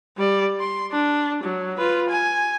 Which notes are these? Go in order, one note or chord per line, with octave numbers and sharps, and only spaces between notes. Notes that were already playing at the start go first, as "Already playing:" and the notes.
G3 D5
C6
D4
F#3
F4 B4
G#5